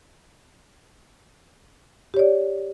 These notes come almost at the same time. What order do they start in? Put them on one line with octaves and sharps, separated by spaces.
G4 C#5 D5